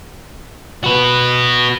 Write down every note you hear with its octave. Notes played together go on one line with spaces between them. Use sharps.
F#4 B4